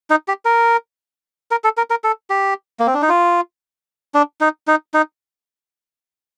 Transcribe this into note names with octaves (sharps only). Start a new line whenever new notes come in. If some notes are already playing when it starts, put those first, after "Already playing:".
D#4
G4
A#4
A#4
A4
A#4
A#4
A4
G4
A#3
C4
D4
D#4
F4
D4
D#4
D#4
D#4